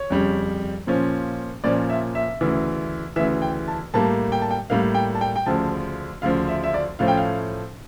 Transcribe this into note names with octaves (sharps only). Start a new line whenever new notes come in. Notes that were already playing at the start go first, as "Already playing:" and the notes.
Already playing: C#5
F2 C#3 G3
A#2 F3 C#4
A#2 F3 C#4 D5
E5
E5
D2 C#3 E3
D2 C#3 E3 E5
G5
A5
A2 G3 A#3 A5
G5
A5
G5
A2 G3 A#3 F5
G5
A5
G5
G5
D2 C#3 F3 A5
D2 C#3 F3 F5
E5
E5
D5
A2 F3 A3 C#4 F5
G5
F5